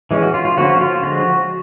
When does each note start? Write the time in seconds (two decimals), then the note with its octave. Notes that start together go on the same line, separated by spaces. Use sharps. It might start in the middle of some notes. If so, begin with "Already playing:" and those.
0.11 E3 G#3 C#4
0.22 F#4
0.34 F4
0.45 F4
0.57 D3 F3 A#3 C#4 F#4
0.81 F4
1.03 D3 F3 G#3 F#4